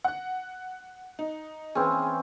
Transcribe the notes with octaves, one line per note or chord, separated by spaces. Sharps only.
F#5 F#6
D#4
E3 C4 C#4 G#4